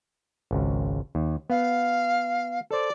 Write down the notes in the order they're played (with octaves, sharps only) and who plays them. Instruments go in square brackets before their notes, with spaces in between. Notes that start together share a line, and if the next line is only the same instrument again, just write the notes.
[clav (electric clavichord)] G#1 C#2
D#2
[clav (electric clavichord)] B3 F#5 [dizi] F5
[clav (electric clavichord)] A4 C5 [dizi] D5